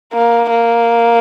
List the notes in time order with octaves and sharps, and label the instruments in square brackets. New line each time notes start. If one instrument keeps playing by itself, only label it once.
[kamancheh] A#3
A#3